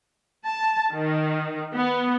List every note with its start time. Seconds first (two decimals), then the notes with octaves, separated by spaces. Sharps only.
0.46 A5
0.92 D#3
1.74 B3